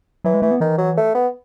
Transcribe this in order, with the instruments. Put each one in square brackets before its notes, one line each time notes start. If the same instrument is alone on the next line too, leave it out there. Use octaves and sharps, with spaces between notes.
[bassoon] E3 [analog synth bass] F#3
[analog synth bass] G#3
[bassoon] E3 [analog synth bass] A3
[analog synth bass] B3
[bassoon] D#3 [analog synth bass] E3
[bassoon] F#3
A3
B3